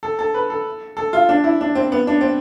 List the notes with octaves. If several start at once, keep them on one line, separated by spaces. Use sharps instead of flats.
A4
A4
B4
A4
A4
F4
D4
E4
D4
C4
B3
D4
C4